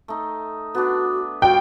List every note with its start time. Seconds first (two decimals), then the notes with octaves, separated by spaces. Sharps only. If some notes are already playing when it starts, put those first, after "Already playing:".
0.08 A3 D#4
0.75 B3 D4 F#4
1.42 G3 F4 F#4 G5